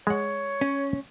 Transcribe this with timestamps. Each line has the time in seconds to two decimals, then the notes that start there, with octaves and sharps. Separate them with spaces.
0.07 G#3 C#5 F#5
0.61 C#4